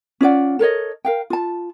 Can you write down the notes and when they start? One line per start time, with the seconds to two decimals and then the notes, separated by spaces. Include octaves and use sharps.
0.21 C#4 F4 D5 F#5
0.59 A4 A#4 C#5 D#5
1.05 A#4 F5 G5
1.30 F4 A5